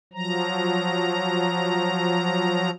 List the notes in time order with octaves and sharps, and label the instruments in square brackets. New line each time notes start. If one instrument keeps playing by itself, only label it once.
[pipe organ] F3 F#3 A#5